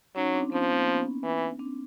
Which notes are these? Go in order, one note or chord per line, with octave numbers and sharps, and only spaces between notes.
F#3 C#4 D#4
C4 D4
F3 B3 C#4
A#3 C4
B3 C#4
E3
C4 D4